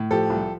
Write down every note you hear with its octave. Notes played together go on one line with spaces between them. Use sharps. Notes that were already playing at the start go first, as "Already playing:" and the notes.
Already playing: A2
F3 G4 A4
C2